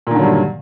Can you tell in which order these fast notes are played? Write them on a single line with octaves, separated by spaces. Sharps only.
A#2 D#3 D3 F#3 G2